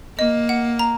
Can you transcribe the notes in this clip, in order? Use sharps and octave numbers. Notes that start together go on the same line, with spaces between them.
A#3 D#5
F#5
A#5